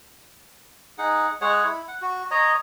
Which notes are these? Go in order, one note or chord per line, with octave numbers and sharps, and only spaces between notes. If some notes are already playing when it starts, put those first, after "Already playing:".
D#4 G#4 F#5
G#3 G#4 C#5 F#5
E4
F#5
F#4
C#5 D#5 A#5